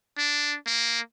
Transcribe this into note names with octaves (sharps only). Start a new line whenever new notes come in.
D4
A#3